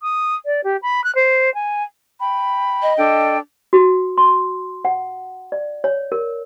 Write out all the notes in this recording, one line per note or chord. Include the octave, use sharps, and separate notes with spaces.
D#6
D5
G4
B5
F#6
C5
G#5
G5 B5
D#5
D4 A4 G5
F#4
C6
F#5
D5
C#5
A#4